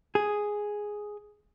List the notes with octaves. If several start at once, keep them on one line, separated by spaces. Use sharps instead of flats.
G#4